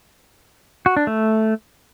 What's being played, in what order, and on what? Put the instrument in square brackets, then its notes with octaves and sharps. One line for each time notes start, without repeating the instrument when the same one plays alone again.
[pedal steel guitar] F#4
D4
A3